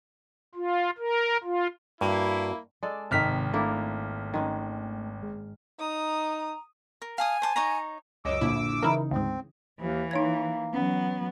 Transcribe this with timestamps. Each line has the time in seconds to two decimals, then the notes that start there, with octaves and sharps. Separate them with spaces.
0.55 F4
0.98 A#4
1.43 F4
2.01 G2 A#3 E4 F#4
2.83 G#3 A4 D5
3.11 G#1 C3 D#3 E5 F6 B6
3.54 A3 A#3 D4 E4
4.34 D#3 G#3 C#4
5.23 G#2
5.80 D#4 A#5 D#6
7.02 A#4
7.18 F5 G#5 A5 D#6
7.42 C5 A5 D6
7.56 D#4 C#5 A#5
8.25 C#2 F#2 C#5 D#5 D6 E6
8.41 A#1 D3 E4
8.83 C#3 E3 D#4 E4 A#4
9.11 D2 G#2 C4
9.80 D#2 E3
10.11 A#3 D#4 C#5 G#6
10.74 E3 F#3 B3 C#4